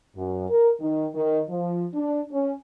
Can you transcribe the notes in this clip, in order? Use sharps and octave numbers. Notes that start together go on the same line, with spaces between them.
F#2
A#4
D#3
D#3
F3
D4
C#4